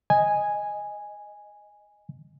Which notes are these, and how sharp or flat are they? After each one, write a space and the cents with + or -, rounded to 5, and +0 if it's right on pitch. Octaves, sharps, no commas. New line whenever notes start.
D#5 +0 G#5 -5